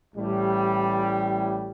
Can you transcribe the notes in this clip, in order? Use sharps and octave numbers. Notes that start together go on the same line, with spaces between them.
A1 A2 G3